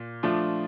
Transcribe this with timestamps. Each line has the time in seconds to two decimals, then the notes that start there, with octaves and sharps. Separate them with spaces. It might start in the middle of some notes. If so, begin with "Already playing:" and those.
Already playing: A#2
0.23 F3 A3 D4 F4